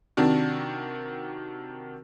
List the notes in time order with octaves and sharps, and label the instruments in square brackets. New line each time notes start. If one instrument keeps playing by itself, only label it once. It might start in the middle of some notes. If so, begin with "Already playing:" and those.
[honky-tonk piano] C3 D#3 D4 F#4